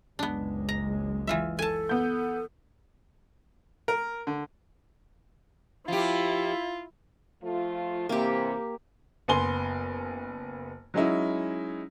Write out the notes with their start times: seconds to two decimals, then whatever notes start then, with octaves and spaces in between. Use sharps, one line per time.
0.19 F#1 C#2 G#3 B3 D4
0.69 A#5
1.27 E3 F4 E5
1.59 A4 G#5 A5
1.89 B3 G6
3.88 A#4
4.27 D3
5.88 F3 E4 F4 G4
7.43 F3 A3 F4
8.09 C3 E3 A#3 G4
9.28 F#1 B3 G#5 C6 G7
10.94 F#3 G#3 C#4 D#4 E4